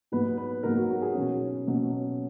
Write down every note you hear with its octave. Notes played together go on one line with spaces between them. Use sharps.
G#2 F#3 B3 B4
B4
G#2 F#3 B3 A#4
F#4
F#4
G#4
B2 F#3 C#4
B2 F#3 C#4